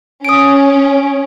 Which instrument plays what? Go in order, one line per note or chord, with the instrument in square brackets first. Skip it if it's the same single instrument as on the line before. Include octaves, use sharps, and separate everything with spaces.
[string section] C#4 [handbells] D#6 D7